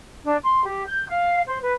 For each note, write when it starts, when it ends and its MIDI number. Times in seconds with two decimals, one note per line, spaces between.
0.24 0.37 62
0.43 0.63 84
0.64 0.83 67
0.87 1.07 91
1.08 1.41 77
1.47 1.57 72
1.61 1.73 71